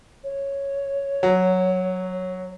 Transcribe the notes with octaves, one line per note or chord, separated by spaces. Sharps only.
C#5
F#3